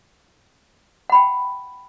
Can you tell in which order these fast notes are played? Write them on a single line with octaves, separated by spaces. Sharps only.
F#5 B5 G5